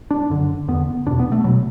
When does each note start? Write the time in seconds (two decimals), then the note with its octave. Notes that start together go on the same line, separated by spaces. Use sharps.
0.11 D4
0.30 F#2 D3
0.68 E2 D3 B3
1.06 E2 B2 D4
1.19 B3
1.32 A3
1.44 B2 F#3